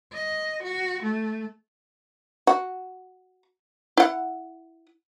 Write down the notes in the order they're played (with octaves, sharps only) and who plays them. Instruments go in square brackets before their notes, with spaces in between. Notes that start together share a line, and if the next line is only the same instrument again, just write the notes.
[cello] D#5
F#4
A3
[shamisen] F#4
E4 F#5